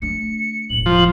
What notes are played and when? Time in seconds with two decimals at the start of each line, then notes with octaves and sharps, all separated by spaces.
0.02 A3 D4 C#7
0.70 E1 A2 F#7
0.86 F3